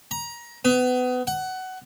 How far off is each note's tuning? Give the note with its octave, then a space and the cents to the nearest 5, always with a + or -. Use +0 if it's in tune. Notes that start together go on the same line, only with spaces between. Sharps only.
A#5 +25
B3 +30
F#5 +15